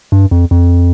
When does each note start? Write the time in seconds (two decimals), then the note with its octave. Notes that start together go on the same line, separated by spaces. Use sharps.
0.12 G2
0.31 F2
0.51 F2